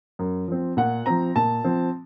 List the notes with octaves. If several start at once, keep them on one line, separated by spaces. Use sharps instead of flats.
F#2
F3 C4
A#2 F#5
F3 C4 A#5
A#2 A5
F3 C4